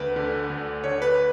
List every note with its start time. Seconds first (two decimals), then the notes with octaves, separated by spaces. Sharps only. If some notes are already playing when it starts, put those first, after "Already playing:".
Already playing: D2 B4
0.16 D3
0.50 D2
0.84 D3 C#5
1.02 B4